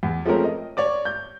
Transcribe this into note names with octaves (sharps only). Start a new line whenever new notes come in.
E2
F3 G#3 A3 C4 C#4 A#4
D#5
C#5 D5 D6
G6